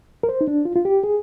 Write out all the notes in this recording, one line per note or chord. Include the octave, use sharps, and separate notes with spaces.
A#4
C5
D#4
D4
F4
F4
G4
G#4